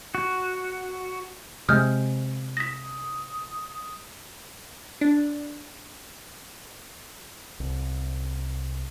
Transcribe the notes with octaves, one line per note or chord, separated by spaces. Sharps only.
F#4
C3 G#3 D#6 F6 G6
D#6 A#6 B6
D4
C2